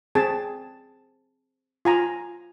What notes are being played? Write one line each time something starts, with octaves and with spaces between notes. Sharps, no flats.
C4 G#4 A5
F4 G#5 A#5